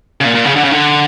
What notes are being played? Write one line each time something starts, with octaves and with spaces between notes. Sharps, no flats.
C#3
A#2
A#2
C#3
D3
C#3
D3